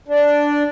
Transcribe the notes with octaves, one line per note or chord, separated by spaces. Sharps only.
D4